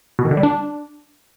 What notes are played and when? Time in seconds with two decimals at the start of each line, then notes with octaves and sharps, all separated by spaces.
0.19 B2
0.25 D#3
0.31 D3
0.37 G3
0.43 D4